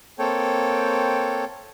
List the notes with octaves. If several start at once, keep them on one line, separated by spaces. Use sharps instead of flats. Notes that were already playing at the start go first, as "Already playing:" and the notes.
A#3 C4 A4 C#5 G5